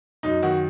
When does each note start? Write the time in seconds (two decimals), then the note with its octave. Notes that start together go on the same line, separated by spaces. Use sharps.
0.23 F#2 D#4
0.43 D#3 F#4